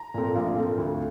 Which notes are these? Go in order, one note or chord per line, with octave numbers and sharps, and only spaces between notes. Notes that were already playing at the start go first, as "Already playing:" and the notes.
Already playing: A#5
A#2 A3 C4
A#1 F5
A#2 A3 C4
D2